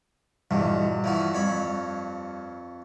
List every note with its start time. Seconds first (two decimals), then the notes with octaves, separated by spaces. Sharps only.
0.51 A#1 E2 G2 B2
1.04 E3 F3 F#4
1.34 F2 C#5 B5